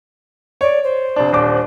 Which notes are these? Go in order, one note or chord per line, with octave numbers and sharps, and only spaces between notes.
C#5 D5
C5
F1 D4
D#1 D4 D6